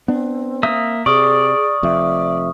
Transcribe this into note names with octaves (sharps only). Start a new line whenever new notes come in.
B3 C4 D4
A#3 E5 D#6
C3 G#4 D5 C#6 D#6 F6
F1 F2 E5